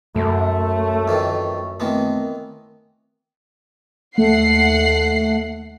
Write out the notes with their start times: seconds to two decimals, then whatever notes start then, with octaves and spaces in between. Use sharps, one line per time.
0.16 F#2 A3 A4 C6
1.08 F2 D#3 E3 C#6
1.80 D#3 E3 A3 B3 C4 A#4
4.18 D#2 A3 F#5 C7